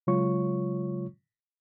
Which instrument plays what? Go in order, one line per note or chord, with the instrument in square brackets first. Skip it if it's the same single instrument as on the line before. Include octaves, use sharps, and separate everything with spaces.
[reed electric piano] C#3 F#3 G#3 F4 C#5 C#6